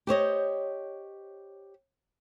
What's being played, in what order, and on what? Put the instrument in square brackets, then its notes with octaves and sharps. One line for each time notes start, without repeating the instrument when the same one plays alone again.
[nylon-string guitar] G4 C5 C#5 D#5